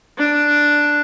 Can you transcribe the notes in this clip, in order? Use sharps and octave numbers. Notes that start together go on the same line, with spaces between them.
D4